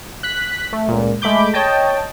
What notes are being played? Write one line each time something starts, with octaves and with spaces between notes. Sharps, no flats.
F#6 B6
A3
C#2 A#2
G#3 A3 B5 D6 G6
C#5 D#5 G5 A5